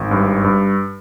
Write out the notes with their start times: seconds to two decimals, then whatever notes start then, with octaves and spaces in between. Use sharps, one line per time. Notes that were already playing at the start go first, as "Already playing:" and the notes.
Already playing: G#1
0.11 G2
0.44 G2